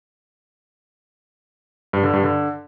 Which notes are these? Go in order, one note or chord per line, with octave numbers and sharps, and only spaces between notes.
G2
D3
G2
D3